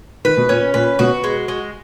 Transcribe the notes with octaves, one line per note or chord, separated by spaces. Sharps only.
D#3 B4
B2
A#2 C#4
A#2 B4
B2 F#4
G#3
G#3